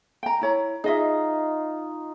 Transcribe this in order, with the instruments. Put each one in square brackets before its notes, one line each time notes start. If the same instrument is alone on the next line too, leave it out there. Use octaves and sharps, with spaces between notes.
[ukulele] G5 A#5
E4 C#5 A#5
[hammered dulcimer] D#4 F4 [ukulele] G#4 D#5 E5